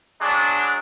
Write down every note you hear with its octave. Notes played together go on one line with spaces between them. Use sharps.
F#3 G#3 D4